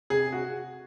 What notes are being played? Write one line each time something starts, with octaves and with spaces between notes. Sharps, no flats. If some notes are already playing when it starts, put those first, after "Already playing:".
C3 G#4
F#4